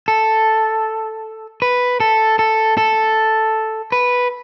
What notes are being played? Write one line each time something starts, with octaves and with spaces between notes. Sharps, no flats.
A4
B4
A4
A4
A4
B4